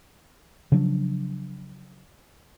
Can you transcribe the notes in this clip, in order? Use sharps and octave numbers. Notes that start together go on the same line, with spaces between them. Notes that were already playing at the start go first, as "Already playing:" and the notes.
C#3 F3 F#3 D4